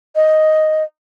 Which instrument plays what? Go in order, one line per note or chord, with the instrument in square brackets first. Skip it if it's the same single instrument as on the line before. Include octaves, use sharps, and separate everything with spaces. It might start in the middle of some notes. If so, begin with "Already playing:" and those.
[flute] D#5